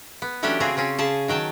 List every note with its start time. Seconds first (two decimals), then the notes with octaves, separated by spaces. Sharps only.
0.22 B3
0.43 E3 F#3 A3 C#4 D4 G4
0.60 C#3 F#3 C4 G#4 A#5
0.77 C#3 C4 C#4
0.98 C#3 G#4 A5
1.28 D#3 F#3 G5 A5